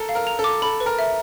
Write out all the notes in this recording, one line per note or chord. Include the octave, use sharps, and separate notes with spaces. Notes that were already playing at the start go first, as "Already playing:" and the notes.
Already playing: A4 A#4
F5
A#4
A#5
A4
D6
A4 B5
B4
A#4
E5